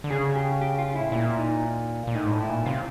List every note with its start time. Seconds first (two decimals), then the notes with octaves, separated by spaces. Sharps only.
0.04 D3
0.10 C#3 G#4
0.36 G4
0.61 G4
0.78 F4
0.96 E4
1.01 A2
1.12 A#2 E4
1.38 D#4
2.07 A#2
2.15 A2 D#4
2.26 G#2
2.32 A2
2.40 E4
2.49 A#2
2.66 C3 F4